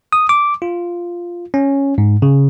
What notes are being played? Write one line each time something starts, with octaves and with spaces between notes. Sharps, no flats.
D#6
D6
F4
C#4
G#2
C#3